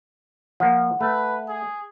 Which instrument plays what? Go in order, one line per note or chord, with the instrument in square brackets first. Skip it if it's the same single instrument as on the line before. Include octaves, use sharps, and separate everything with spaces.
[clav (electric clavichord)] F3 A#3 [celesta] F#5
[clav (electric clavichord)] A3 [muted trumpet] B4
[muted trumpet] G#4